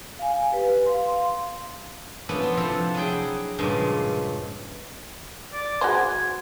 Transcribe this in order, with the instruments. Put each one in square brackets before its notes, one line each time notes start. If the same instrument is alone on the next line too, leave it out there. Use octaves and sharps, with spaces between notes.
[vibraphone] F5 G#5
G4 B4
F5 C6
[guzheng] F3 B3 C#4 D4 E4
F4 C6
C3 F3 E4 A4
F#3 E4 G#4 G5
G2 A#2 C#3 F3 G#3
[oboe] D5
[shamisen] F#4 G#4 C5 [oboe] G#5